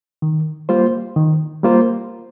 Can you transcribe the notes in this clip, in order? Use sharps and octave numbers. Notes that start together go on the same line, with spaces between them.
D#3
G3 A#3 F4 C5
D#3
G3 A#3 F4 C5